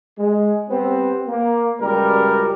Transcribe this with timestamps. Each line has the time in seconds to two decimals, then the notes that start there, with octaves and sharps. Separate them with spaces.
0.18 G#3
0.69 G3 B3 C4
1.28 A#3
1.81 C#2 F#2 G3 A#4